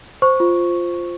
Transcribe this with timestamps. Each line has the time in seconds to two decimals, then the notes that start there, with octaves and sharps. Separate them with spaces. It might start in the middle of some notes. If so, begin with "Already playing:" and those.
0.22 C5 C#6
0.40 F4